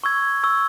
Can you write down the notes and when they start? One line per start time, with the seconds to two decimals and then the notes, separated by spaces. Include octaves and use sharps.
0.04 C#6 E6 G#6
0.43 C#6 E6 G#6